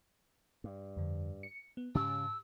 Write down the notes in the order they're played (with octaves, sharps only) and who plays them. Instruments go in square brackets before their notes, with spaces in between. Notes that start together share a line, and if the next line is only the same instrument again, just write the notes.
[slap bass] G2
[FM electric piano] F2 D3
C#7
B3
[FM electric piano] G#2 G4 A5 [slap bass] C#3 C#4 [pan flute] E6